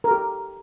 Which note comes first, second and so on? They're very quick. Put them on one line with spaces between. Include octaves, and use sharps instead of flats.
A#4 A4 G4